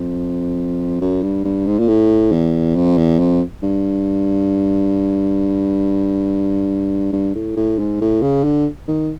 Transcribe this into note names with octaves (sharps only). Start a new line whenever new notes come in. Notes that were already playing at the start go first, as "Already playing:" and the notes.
Already playing: F2
F#2
G2
G2
G#2
A#2
A2
E2
F2
E2
F2
G2
G2
A2
A2
G#2
A2
C#3
D3
D#3